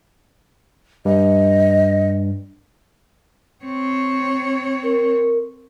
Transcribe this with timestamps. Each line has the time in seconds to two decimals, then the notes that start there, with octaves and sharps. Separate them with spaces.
1.05 G2 D#5
3.65 C4 C#5
4.83 A#4